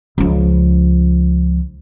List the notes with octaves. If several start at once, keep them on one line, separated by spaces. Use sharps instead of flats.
C#2 F3